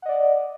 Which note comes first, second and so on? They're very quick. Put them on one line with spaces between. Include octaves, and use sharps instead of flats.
F#5 D#5 D5